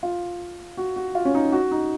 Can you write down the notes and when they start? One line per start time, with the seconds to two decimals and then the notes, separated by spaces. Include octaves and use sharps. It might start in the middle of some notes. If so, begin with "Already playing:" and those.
0.03 F4
0.78 F#4
0.96 F#4
1.15 F4
1.25 C#4
1.35 D#4
1.52 F#4
1.71 D#4